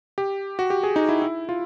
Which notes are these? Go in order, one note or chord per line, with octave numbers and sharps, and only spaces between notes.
G4
F#4
G4
G#4
D#4
E4
E4
F4